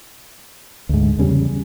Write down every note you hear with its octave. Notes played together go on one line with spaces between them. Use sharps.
D2 G#2
E2 C#3 G3